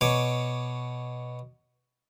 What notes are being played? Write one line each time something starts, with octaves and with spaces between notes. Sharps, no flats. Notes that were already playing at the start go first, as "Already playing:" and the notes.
B2 C#5 D6